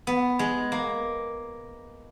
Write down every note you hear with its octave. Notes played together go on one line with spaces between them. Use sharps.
B3
G#3
A#3